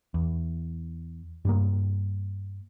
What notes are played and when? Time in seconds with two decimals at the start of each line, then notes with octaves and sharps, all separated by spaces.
0.14 E2
1.45 G2 G3 A#3